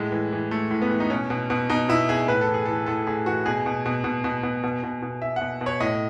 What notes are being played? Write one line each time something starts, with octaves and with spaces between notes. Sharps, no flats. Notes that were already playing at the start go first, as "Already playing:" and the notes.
Already playing: A2 G#3
E3
E3
A2 A3
A2
B3
E3
D#4
B2 C#4
B2
B2
B2 D#4
B2 E4
B2 G#4
A2 B4
A4
E3
G#4
E3 A4
A2 A4
A2 G#4
E3 F#4
B2 G#4
B2
B2
B2
B2
B2
B2
B2
B2
B2 E5
F#5
B2
B2
C#5
A2 D#5